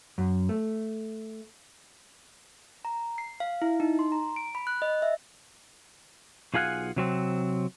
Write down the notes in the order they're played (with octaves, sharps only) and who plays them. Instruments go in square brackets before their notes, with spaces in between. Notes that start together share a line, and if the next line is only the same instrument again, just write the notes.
[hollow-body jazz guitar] F#2
A3
[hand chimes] A#5
C7
F5
E4
D#4
C6
A#5
D7
B5
F#6
D#5
E5
[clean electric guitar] B1 F4 G#4 F5 F#5 G#5
C3 F#3 C4